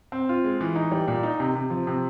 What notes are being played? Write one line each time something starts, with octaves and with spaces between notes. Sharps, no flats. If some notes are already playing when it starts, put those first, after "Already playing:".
C4
F4
G#3
E3
D#4
G3
A#2
D#4
C3
C3
F3
C3